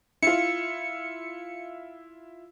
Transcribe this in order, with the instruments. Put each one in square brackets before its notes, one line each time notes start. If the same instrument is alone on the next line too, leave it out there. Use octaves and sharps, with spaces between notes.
[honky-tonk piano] E4 F4 [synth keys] C#7